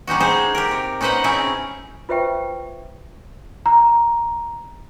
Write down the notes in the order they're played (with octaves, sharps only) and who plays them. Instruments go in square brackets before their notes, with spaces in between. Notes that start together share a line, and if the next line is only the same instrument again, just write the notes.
[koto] G3 C#4 D#4 F#4
G#3 D#4 G#4 C5
G4 A#4
C3
C#4 D#4 B4 C5 D#5 F#5
B2 C4 C#4 D#4 E4 G#4
[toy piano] F4 B4 C5 E5 G5 C#6
[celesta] A#5